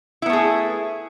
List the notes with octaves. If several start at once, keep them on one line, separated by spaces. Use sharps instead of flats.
A3 B3 E4 G#4